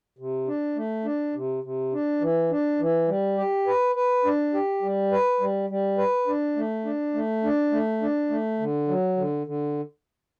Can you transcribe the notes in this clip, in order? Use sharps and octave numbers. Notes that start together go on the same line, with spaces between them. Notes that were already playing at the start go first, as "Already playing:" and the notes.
C3
D4
A3
D4
C3
C3
D4
E3
D4
E3
G3
G4
B4
B4
D4
G4
G3
B4
G3
G3
B4
D4
A3
D4
A3
D4
A3
D4
A3
D3
F#3
D3
D3